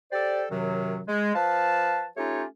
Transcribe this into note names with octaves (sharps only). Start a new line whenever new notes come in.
G4 A4 C5 D5
F#2 C3 D#3 F#3
G#3
F3 B4 F5 A5
A3 C#4 D#4 F4 G4 C#5